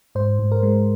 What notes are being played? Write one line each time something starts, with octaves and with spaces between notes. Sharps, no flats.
G#2 C5
G#2
A#4
G#3